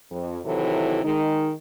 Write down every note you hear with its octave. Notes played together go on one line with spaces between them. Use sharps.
F2
C3 D#3 E3 F#3 E4 A4
D#3 G#3 D#4